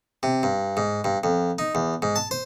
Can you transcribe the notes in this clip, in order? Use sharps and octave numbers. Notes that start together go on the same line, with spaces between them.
C3
G2
G#2
G2
F2
D#4
E2
G#2
A5
C5